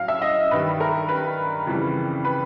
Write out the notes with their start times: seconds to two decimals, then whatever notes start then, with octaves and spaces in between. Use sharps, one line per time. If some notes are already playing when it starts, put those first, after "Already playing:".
Already playing: A2 F#3 F5
0.08 E5
0.22 D#5
0.51 G2 D#3 G3 B4
0.80 A#4
1.08 B4
1.67 F2 C#3 E3 G3
2.25 B4